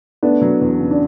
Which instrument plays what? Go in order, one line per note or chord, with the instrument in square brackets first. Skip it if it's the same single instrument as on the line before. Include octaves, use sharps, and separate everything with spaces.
[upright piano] A3 [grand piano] B3 D4
[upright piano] F#3
E2
C#3
[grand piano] D4